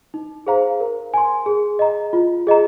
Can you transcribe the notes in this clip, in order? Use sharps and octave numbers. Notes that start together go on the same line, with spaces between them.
D#4
G#4 C5 F5 A#5
A#4
G#5 C6
G#4
D#5 A#5
F4
G#4 D#5 A#5